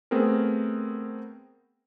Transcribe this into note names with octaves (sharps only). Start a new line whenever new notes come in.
A3 B3 C4 G#4 A#4